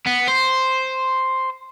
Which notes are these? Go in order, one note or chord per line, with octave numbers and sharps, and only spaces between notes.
B3
C5